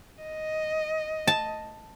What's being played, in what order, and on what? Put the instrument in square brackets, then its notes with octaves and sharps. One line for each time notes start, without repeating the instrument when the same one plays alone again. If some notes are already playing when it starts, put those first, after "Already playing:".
[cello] D#5
[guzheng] A5